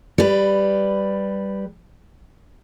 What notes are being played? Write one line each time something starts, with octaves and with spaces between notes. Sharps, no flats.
G3 B4